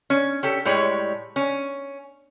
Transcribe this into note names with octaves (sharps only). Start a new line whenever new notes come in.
C#4
C#4 G4 A4
A2 G3 G#3 C#5
C#4